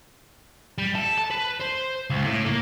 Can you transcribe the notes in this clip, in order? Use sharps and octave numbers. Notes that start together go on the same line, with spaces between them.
G3
A4
A5
B4
C5
C#2
A2
A#3